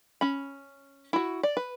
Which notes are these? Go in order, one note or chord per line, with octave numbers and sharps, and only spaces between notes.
C#4 B5
E4 F#4
D5
B4